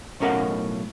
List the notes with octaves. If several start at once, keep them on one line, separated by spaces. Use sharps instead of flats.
B1 A2 C#4 A#4 F5 F#5